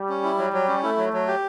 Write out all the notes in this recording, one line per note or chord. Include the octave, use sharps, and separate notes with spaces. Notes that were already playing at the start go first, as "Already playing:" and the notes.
Already playing: G3
C#4
E4
F#3
F#3
C#4
A3 E4
F#3
F#3
G4